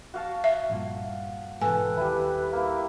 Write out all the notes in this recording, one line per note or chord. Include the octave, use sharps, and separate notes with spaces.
F#4 F5 A5
E5
A#1 G2 A#2
G#2 B2 E3 A4 B4 G5 G#5
D#2 G3 E4
A#3 E4